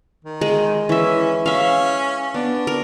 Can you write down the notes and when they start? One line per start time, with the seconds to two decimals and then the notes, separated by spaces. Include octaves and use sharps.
0.25 D#3
0.41 G#3
0.89 E3 C#4 E5
1.46 C#4 E5 F5
2.34 B3 D4
2.67 A#4